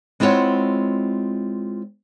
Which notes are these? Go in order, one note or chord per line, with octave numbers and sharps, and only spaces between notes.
G#3 C4 E4 F4 C#5 F#5